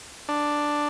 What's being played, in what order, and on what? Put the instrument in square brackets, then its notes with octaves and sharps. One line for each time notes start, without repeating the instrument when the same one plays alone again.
[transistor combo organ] D4